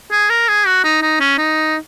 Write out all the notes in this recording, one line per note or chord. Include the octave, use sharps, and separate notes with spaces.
G#4
A#4
G#4
F#4
D#4
D#4
C#4
D#4